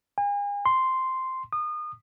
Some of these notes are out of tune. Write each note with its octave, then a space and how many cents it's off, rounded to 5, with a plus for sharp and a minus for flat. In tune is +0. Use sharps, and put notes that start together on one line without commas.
G#5 -40
C6 -5
D#6 -30